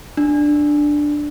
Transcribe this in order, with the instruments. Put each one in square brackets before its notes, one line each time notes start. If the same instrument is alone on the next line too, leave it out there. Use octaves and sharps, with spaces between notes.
[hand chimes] D4